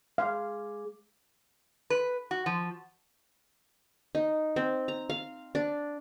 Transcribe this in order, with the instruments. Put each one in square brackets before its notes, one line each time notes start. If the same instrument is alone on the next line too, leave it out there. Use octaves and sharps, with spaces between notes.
[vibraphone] G#3 G#4 D6 [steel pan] F5
[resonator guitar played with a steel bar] B4
F#4
F3
[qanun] D#4
C4
A#5
F5
D4